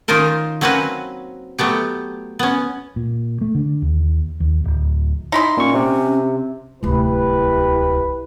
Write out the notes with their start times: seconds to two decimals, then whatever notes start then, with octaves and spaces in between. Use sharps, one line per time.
0.08 D#3 C#4 D#4 F4 A#4 C5
0.61 F#3 A#3 C4 C#4 F#4 B4
1.59 F#3 A3 B3 G4
2.39 B3 C#4
2.96 A#2
3.41 A3
3.55 D3
3.82 D#2
4.40 D#2
4.64 D1
5.32 D#4 E4 C6
5.57 A#2 C#4 C#6
5.74 C3
6.83 D1 C2 E4 G4 B4